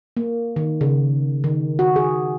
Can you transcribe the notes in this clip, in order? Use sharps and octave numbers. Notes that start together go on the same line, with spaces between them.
A#3
D#3
C#3
D#3
F#4
G#4